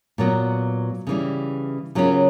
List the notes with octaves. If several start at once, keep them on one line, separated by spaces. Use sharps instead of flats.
A#2 F#3 B3
C#3 E3 G3
C#3 F#3 A#3 C#4 F4